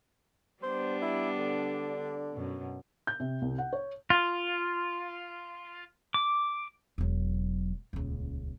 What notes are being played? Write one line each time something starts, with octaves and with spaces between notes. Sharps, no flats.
G3 B3 D4 C5
E4
D3
F#2 B2
G6
C3
C2
F#5
C#5
F4
D6
E1 F#3
D#1 C#2